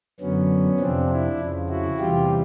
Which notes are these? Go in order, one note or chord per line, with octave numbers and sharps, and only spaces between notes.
F#2 D3 F#3 B3 C#4
F2 C3 F3 C4 D4
D4 E4
F2 C#3 F3
E4 F#4
E2 C3 E3 G3 F4 G4